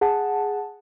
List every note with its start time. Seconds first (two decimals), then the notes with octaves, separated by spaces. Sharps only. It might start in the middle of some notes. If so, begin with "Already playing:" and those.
0.01 G#4 F#5 A5